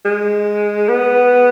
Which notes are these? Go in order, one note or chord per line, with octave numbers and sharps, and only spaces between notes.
G#3
B3